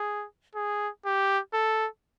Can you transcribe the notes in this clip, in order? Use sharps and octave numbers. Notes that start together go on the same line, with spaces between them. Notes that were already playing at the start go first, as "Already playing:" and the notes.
Already playing: G#4
G#4
G4
A4